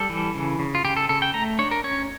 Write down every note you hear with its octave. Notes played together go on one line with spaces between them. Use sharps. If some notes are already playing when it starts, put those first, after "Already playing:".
Already playing: G3 A4
E3
C#3
C#3
F4
C#3 G4
A4
C#3 A4
G5
A3 A#5
D4 C#5
A#4
C#4 C#5